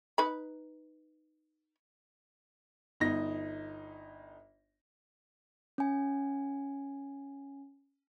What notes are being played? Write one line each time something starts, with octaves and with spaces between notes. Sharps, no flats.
D#4 B4 B5
G1 D#4 A#6
C#4 G#5